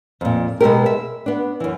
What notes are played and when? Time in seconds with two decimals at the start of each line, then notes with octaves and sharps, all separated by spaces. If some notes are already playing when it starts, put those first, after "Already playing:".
0.21 F2 A#2
0.60 B2 G#3 E4 G4 A#4
0.86 E5
1.26 B3 D4
1.60 F#2 E3